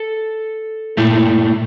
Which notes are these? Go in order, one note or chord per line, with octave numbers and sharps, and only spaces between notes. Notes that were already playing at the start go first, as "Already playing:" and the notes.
Already playing: A4
A#2 A3 E4